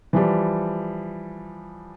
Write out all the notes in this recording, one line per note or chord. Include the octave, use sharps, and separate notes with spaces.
E3 F3 G3